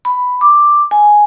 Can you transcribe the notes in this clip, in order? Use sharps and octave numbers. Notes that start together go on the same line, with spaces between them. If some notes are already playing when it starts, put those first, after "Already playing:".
B5
D6
G#5